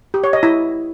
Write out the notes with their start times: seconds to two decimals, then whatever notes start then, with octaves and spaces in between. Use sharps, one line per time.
0.14 G4
0.24 C#5
0.33 D#5
0.43 E4